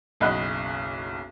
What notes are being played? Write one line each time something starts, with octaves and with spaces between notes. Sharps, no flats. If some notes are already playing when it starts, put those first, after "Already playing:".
F#1 B1 D#5 F#5 B5 F#6